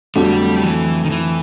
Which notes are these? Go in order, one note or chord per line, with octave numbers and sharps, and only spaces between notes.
F2 D3 F#3 G3 A3
E3
D#3
E3